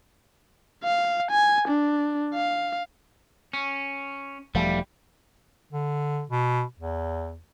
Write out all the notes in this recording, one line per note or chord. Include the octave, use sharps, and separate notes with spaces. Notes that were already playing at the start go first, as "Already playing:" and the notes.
F5
G#5
D4
F5
C#4
E1 F3 G3 A3
D3
B2
E2